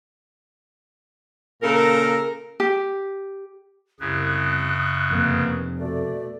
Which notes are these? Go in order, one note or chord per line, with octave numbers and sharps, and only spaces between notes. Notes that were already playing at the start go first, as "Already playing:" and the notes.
A#2 C#3 A4 A#4
G4
C2 F#2 C#3 D#6 F#6
F2 C3 A#3 B3
B2 A3 D5